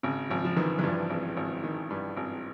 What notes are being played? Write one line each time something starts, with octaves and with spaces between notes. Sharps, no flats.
G#1 C#3
G#1 F3
F3
D#3 E3
E3
G2 F3
G#1
G#1
D#3
G2
G#1